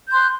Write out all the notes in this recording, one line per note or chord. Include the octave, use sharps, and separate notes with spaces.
C6 F#6 G6